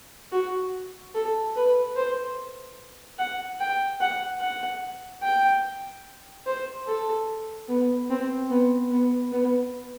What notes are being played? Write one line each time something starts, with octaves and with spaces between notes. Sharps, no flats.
F#4
A4
B4
C5
F#5
G5
F#5
F#5
G5
C5
A4
B3
C4
B3
B3
B3